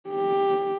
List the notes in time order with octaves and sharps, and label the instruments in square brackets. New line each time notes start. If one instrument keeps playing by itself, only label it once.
[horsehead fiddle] G4